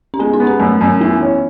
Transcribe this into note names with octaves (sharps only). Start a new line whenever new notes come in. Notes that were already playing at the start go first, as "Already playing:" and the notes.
C#4
G#3 B3
D#4
B3
C#4
F#2 A3
F#2
E3 B3
C#4